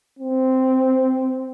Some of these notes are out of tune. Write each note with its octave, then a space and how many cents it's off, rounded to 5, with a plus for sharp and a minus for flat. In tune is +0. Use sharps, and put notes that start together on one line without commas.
C4 -5